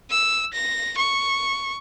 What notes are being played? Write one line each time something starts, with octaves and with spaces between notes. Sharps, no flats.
E6
A#6
C#6